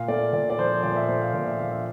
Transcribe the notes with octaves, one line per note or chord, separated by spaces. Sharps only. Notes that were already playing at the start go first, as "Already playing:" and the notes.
Already playing: A#2 F5
A3 D5
A#2 D5
D5
F3 C5
A#2 D5
E5
A3 C5
F5
A#2 D5
E5
F3 F5
E5